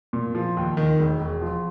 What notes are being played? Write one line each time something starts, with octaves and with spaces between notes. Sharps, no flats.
A#2
F3
D#2
D#3
E1
E1
F3